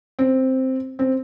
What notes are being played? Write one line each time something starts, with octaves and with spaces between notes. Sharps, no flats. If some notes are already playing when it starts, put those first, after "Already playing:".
C4
C4